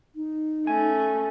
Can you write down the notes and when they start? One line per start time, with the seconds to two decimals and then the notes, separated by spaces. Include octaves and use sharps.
0.15 D#4
0.67 A3 C#4 G#5